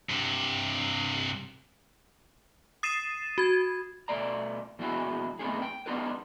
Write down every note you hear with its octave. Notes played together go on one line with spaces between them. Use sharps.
G2 C3
D#6 A6 C7 D#7 E7
F#4 G#6
B2 A3 D5 A#5
A#2 E3 B3 E4 F#4 G#4
A#2 A3 B3 C4 D#4 G#4
G5
B3 D4 D#4 F4 A#4 B4